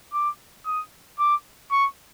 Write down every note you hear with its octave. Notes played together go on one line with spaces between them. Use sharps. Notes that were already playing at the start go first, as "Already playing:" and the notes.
D6
D#6
D6
C#6